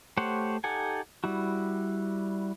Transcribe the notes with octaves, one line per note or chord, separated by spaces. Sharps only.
A3 G4 C5 C#5 F#5
D#4 G4 A4 F#5 G#5
G3 E4 F#4